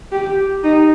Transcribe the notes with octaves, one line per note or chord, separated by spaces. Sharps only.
G4
D#4